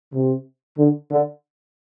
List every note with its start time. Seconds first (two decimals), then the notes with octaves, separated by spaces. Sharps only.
0.13 C3
0.78 D3
1.11 D3